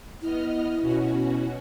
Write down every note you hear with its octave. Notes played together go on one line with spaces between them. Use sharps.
B3 E4 D#5 F6
B2 C#4 F#4